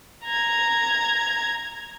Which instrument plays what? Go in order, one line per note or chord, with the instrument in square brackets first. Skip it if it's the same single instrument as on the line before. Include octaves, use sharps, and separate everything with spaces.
[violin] A#5 G#6